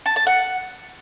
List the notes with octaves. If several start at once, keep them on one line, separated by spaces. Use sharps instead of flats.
A5
A5
F#5